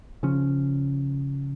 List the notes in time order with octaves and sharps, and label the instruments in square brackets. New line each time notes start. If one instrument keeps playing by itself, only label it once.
[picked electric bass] C#3 F3 C#4